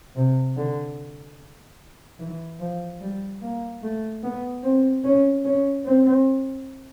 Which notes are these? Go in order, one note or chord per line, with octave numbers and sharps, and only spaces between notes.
C3
D3
E3
F3
G3
A#3
A3
B3
C4
C#4
C#4
C4